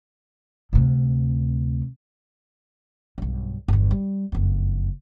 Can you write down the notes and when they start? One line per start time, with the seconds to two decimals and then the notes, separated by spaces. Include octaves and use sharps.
0.73 D2 C3
3.18 B1 G2
3.68 G1 E2
3.91 G3
4.32 F#1 F2